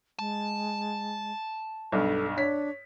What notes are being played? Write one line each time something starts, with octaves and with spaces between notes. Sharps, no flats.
G#3 A5
B1 G2 A4
D4 C#5 B6